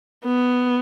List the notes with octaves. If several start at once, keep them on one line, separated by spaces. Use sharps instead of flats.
B3